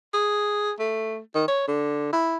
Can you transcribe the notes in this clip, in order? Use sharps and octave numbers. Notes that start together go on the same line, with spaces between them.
G#4
A3
D#3
C#5
D3
E4